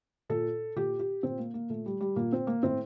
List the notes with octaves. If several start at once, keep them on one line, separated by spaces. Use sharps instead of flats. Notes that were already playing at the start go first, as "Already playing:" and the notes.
A#2 A4
A#2 G4
G4
A#2 C4
A#3
A#3
A#2 A3
G3
G3
A#2 A#3
C4
A#3
A2 C4